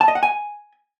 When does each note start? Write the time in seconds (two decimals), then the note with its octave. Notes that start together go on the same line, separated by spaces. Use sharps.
0.01 A5
0.08 D#5
0.15 F#5
0.23 G#5